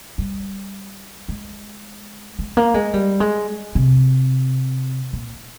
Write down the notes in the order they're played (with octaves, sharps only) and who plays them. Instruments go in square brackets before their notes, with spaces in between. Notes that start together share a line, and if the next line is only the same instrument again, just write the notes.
[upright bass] G3
G#3
G#3
A#3
G#3
G3
G#3
C3
A#2